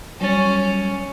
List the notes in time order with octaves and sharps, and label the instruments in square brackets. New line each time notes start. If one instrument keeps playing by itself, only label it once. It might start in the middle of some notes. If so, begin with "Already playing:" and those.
[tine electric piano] F#3 G3 A6 [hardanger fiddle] C#4